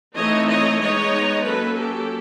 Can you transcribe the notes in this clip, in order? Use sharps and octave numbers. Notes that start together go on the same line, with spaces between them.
E3 A3 C4 D#4 C#5 D#5
C#5 D#5
G#3 B3 D#4 C#5 D#5
F#3 A#3 C#4 A4 B4
G4 A4